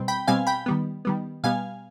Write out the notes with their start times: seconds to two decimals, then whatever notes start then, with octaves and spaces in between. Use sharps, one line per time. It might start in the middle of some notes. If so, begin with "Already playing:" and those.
Already playing: B2 G3 C4
0.08 G5 B5
0.27 B2 G3 C4 F5 G#5
0.47 G5 B5
0.66 D#3 G3 B3
1.05 D#3 G3 B3
1.44 B2 G3 B3 F5 G#5